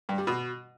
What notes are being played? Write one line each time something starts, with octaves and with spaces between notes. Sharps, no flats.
G2
G3
B2